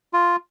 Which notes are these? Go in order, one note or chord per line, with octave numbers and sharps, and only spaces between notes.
F4